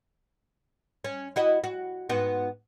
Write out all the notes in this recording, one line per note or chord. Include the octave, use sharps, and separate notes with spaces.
C#4
E4 F#4 D#5
F#4
G#2 B3 F#4